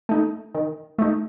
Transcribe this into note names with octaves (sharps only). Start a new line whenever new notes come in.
A3 D#4
D#3
A3 D#4